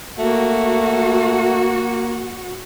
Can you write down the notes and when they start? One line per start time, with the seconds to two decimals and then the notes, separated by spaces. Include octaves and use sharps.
0.19 A3 A#3 F#4